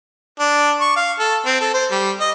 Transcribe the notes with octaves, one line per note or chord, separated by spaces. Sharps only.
D4
C#6
F5
A4
C4
A4
C5
G3
D#5